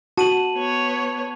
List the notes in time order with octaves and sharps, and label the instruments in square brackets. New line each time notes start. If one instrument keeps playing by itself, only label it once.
[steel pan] F#4 [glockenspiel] A5 D#7 F#7
[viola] B3 C#5